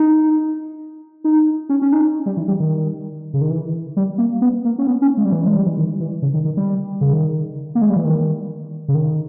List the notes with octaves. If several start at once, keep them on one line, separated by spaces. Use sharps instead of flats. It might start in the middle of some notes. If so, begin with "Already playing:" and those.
Already playing: D#4
D#4
C#4
C#4
D#4
G3
E3
G3
D#3
C#3
D#3
E3
G3
A#3
B3
A#3
C#4
B3
C#4
G#3
G3
E3
G#3
G3
E3
D#3
E3
C#3
D#3
D#3
G3
C#3
D#3
A#3
G#3
G3
E3
D#3
C#3
D#3